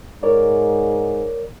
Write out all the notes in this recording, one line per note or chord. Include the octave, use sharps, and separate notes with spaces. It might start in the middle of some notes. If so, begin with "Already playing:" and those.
G#2 A#4 C#5 D5